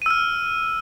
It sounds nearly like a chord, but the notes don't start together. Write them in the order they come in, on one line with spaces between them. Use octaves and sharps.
D#7 E6 F6